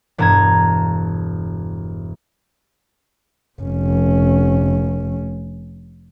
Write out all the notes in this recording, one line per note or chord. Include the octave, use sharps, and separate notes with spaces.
E1 G2 A5 A#5 G#6
F1 C#4